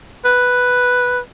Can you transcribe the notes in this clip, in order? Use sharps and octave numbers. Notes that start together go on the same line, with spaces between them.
B4